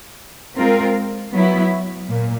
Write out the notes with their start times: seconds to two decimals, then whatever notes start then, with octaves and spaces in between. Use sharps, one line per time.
0.56 G#3 C4 F4 A#4
1.32 F#3 B3 E4
2.08 A#2